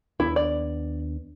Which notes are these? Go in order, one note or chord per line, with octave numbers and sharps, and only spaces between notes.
D#2 B3 D4 E4
D5